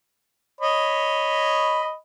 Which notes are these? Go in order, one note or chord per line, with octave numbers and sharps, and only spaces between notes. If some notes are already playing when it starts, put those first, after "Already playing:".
C#5 D#5 B5